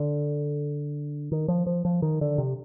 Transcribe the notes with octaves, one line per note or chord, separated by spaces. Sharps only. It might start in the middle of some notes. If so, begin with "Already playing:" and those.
Already playing: D3
D#3
F3
F3
F3
D#3
D3
C3